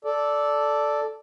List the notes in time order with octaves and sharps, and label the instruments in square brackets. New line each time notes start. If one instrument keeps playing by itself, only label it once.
[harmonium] A4 D5